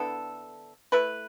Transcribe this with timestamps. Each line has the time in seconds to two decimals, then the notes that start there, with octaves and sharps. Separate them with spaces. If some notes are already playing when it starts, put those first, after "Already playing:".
Already playing: D3 B3 E4 A4
0.92 A3 E4 B4